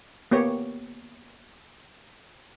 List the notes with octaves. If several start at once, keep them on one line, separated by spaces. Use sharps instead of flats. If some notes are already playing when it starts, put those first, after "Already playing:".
A#3 B3 G4 C#5